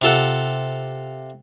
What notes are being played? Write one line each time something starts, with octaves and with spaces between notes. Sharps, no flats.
C3 F4 A4 F#5